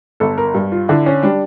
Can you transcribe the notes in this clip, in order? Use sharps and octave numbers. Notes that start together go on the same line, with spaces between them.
G1 A4
A#4
G2
F4
D3 E4
C#4
G3 D4